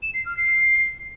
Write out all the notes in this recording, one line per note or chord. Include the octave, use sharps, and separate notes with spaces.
E7
C7
F6
C7